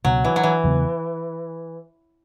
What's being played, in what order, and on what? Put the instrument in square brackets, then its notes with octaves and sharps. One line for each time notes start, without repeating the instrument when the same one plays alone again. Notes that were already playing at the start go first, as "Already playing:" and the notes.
[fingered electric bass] C#2 B2 B3 [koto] F#3
[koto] E3
F#3
E3
[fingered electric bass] E2 C#3 F#3 B3